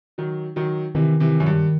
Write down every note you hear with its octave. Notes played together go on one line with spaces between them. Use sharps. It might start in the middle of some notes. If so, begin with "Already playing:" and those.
D#3 F#3
D#3 F#3
C3 D#3 E3
C3 E3
F#2
G2